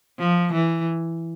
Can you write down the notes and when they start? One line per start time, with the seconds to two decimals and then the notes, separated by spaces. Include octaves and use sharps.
0.19 F3
0.53 E3